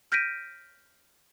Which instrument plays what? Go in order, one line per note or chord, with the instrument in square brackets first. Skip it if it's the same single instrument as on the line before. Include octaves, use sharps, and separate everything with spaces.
[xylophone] F6 G6 A#6 B6 D7 D#7